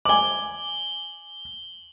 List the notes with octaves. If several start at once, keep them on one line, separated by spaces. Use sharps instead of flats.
G#5 D6 F#7 G7